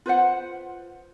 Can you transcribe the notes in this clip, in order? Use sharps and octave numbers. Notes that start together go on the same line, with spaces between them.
F4 B4 C5 F#5